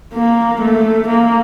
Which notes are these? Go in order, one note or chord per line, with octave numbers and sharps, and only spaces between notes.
A#3
A3
A#3